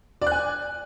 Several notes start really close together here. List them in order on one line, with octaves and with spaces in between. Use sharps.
D5 F#6 G#5